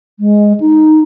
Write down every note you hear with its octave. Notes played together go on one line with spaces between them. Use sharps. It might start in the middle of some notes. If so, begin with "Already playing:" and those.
G#3
D#4